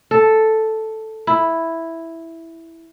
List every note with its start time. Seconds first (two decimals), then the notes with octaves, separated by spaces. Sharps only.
0.11 A4
1.27 E4